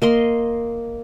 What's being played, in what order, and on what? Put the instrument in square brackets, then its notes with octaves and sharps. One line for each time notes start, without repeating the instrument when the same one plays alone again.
[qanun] A#3 D#5 C6